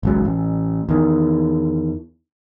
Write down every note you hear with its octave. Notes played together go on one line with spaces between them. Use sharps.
G#1 C#2 F#3
A1
E2 D#3